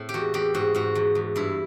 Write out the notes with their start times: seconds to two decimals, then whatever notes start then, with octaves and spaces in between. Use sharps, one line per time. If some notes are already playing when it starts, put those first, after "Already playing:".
Already playing: A2 C4
0.09 G4
0.14 E2 F#4
0.34 E2 G4
0.54 G#2 F#4
0.75 G#2 F#4
0.95 E2
1.15 E2
1.36 G2 E4